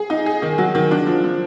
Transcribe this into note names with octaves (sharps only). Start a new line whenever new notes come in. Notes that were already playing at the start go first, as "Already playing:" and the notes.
Already playing: G#4
D#4
G#4
D#3
F#3
D#3
D4
F3
F3